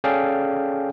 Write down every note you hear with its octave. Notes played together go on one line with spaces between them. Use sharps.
C#4 G#4 A4 D5 F5 G5